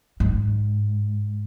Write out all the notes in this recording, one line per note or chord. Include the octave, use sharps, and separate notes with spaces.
G#2